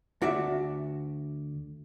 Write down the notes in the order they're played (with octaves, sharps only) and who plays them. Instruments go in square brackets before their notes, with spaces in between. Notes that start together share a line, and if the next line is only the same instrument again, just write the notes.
[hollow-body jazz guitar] D2 F#4 D5 E5